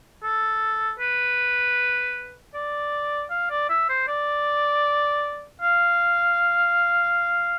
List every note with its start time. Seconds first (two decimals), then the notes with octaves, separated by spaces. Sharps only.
0.23 A4
0.99 B4
2.54 D5
3.30 F5
3.50 D5
3.69 E5
3.89 C5
4.08 D5
5.61 F5